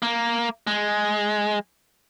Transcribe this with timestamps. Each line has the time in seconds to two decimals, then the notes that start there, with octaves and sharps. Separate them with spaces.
0.02 A#3
0.67 G#3